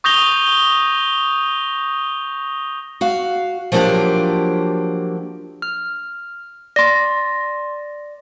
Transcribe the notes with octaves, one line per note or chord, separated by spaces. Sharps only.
C#6 D#6 G6 A#6 F7 G7
F#4 F5
F3 F#3 A#3 D4 F4 G4
F6
D5 C6 A#6